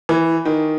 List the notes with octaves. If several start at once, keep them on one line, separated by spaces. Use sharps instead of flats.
E3
D#3